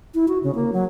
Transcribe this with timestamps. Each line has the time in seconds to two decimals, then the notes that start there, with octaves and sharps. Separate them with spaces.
0.15 E4
0.28 F#4
0.43 C#3
0.55 A#3
0.73 F#3